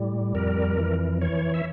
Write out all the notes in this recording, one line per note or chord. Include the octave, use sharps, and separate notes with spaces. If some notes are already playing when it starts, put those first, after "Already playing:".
Already playing: A2 G3
F2 A#4
E3
E3 C#5
E5